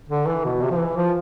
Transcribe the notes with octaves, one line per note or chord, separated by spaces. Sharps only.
D3
E3
B2
C3
F3
E3
F3